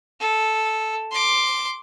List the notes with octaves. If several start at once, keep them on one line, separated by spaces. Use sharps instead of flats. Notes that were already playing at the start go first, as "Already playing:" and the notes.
A4
C6 D6